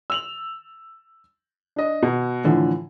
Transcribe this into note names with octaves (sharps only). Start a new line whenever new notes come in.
E6 F7 F#7
D4 D#5
B2
A2 D3 E3 F3